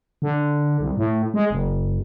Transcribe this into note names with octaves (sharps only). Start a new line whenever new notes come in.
D3
C2
A2
G#3
F#1